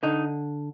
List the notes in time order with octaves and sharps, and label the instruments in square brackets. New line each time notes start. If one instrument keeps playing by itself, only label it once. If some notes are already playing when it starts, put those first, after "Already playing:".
[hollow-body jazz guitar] D3 D#4